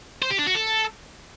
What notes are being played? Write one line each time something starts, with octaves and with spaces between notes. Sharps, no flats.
C5
G4
D4
F#4
A4